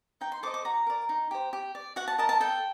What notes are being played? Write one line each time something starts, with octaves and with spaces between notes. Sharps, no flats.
D#4 G5
C6
A4 C5 D#5 D6
D6
F#4 A#5
A#4 D5
D#4
G4 C5
G4
D5
F#4 F#5
A5
A#4 D#5 A5
A5
A4 G5